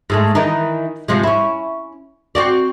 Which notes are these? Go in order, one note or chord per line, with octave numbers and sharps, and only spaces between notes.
G#2 G#3 A3
D#3 E3 D#4
C3 F3 G#3
C#4 E4
C4 F#4 D5